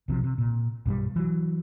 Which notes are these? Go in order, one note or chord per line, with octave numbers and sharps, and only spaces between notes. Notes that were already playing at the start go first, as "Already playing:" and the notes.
B1 C3 F3
C3
A#2
B1 G2 D#3 G3
E3 F#3